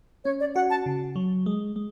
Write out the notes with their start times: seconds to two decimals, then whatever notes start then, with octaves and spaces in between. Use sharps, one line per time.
0.25 C#4 C#5
0.40 D5
0.55 F#4 F#5
0.70 A5
0.86 C#3
1.16 F#3
1.46 G#3
1.76 G#3